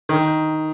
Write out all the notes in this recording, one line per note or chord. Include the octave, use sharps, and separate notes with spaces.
D#3